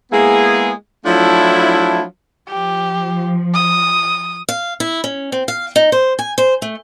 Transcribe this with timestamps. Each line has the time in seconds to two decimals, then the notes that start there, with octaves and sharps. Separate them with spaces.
0.12 G#3 A#3 B3 E4 G#4
1.05 F3 F#3 A3 D4 E4
2.49 F3 G4
3.54 D#6
4.49 F5
4.80 E4
5.04 C#4
5.32 C4
5.48 F5
5.76 D#4
5.92 C5
6.19 G#5
6.38 C5
6.62 A3